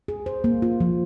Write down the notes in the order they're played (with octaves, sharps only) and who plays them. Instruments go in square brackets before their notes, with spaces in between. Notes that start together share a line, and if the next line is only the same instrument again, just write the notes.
[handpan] G#4
C5
A#3
F4
F3